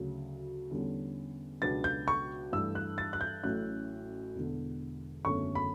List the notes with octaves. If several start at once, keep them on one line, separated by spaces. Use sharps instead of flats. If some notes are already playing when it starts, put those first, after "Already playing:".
Already playing: D2 C#3 F#3
E2 D3 G3 C#4
C#2 B2 F#3 B3 D4 A6
G6
C#6
G2 E3 A3 D4 E6
F#6
A6
F#6
G6
A1 A2 F#3 C#4 F#6
E1 E2 D3
F#1 E2 D3 A3 C#4 C#6
B5